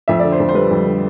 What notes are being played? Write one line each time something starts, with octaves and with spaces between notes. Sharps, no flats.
F2 E5
D3 D5
C5
F2
C5
G3 B4
F2
D3